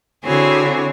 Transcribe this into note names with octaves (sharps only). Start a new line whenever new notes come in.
D3 C4 E4 F#4 G#4 C#5